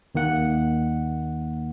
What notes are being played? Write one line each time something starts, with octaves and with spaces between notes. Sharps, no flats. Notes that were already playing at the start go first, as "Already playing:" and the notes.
D#2 D#3 A#3 F#5